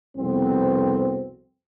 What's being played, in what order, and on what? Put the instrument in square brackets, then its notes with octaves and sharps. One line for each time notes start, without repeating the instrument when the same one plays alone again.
[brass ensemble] C2 F2 B2 B3 C4